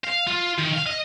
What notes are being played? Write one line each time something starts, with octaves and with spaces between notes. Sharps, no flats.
F5
F4
D#3
F5
D#5